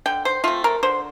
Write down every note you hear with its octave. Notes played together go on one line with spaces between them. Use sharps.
D3 G5
C5
A3 C4 F4
A#4
D3 C5